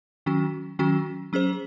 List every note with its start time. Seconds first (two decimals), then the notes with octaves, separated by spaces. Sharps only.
0.26 D#3 F#3 C#4 F#4
0.79 D#3 F#3 C#4 F#4
1.33 F#3 C#4 G#4 C5